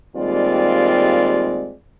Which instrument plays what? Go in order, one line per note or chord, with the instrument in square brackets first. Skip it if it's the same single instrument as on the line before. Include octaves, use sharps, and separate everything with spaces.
[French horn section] D#2 G3 G#3 C4 F4 D5